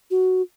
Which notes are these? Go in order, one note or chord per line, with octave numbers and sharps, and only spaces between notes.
F#4